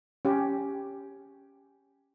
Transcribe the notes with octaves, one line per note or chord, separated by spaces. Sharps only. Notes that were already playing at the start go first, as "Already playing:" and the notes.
C#4 G4